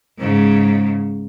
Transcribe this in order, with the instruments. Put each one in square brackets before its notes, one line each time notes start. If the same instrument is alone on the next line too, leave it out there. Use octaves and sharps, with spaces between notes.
[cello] G#2 C#3